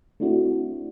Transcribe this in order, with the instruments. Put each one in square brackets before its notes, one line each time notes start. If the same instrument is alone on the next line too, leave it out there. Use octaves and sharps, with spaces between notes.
[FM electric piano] A3 C4 D4 E4 F#4